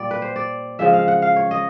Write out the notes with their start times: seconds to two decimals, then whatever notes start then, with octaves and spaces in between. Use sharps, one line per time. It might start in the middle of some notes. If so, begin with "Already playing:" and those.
Already playing: A#2 G3 D5
0.11 B4
0.22 C5
0.36 D5
0.79 C#3 F3 G#3 E5
0.93 F5
1.08 F#5
1.22 F5
1.36 C#5
1.51 D#5